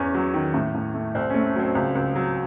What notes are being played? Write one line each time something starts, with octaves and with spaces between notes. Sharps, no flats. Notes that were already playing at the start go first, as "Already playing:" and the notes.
Already playing: E2 C#4
F#3
D#3
A2
A2
A3
C2 C4
A3 C#4
F#3 C4
C#2
C#2
F#3